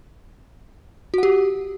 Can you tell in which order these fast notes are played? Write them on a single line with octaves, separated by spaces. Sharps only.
F#4 F#5 G4